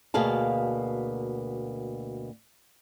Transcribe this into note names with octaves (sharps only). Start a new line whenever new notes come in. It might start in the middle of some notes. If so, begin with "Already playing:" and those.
D2 B2 A#3 G#4 F5 A5